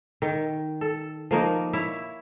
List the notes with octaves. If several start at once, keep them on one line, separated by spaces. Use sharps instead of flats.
D#3
A4
F3 A#3 D#4
E4 C#5